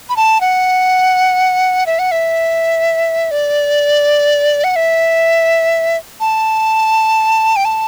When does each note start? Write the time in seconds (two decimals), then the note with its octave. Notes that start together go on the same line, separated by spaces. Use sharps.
0.09 B5
0.16 A5
0.41 F#5
1.86 E5
1.99 F#5
2.11 E5
3.31 D5
4.64 F#5
4.76 E5
6.20 A5
7.56 G5
7.65 A5